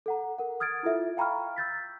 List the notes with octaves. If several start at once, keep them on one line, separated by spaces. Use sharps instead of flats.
A4 F#5 A#5
A#4 F#5
D#6 F6 G#6 A6 D7
E4 F4 A4 E5
F5 G5 A#5 B5 C#6 F6
E6 G6 A6 B6